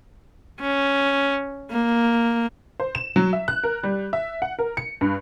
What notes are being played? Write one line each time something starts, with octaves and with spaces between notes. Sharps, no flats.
C#4
A#3
C5
E7
F#3
E5
F#6
A#4
G3
E5
F#5
A#4
C#7
G2